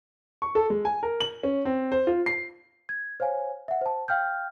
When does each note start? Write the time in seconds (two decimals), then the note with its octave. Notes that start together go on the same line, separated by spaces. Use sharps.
0.42 C#6
0.55 A4
0.70 G#3
0.85 G#5
1.03 A#4
1.20 F#7
1.43 C#4
1.65 C4
1.92 C5
2.07 F4
2.26 C7
2.89 G#6
3.20 C5 C#5 F5 G#5
3.68 E5 F#5
3.81 C5 A5
4.08 F5 G5 F6 G6